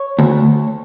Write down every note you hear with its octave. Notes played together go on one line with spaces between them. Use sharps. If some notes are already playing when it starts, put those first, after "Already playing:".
Already playing: C#5
D2